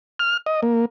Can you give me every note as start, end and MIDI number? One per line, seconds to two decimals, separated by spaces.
0.20 0.37 89
0.46 0.61 75
0.63 0.85 58